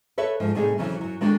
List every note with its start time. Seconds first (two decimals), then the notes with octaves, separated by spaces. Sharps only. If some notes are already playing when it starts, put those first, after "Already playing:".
0.18 A4 B4 C#5 E5
0.40 G#2 F3 D#4
0.55 A2 C3 G3 D#4 G#4
0.78 F2 C#3 E3 F#3
1.01 F#2 F#3
1.21 D#3 G#3 D4 F#4 A4 G5